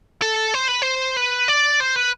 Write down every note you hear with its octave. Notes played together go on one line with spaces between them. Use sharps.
A4
C5
B4
C5
B4
D5
C5
B4